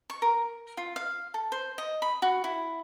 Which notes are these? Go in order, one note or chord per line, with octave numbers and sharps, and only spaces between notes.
C#6
A#4
F4
F5
A4
C5
D#5
B5
F#4
E4